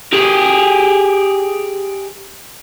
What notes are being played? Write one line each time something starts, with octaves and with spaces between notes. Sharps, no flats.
G4 G#4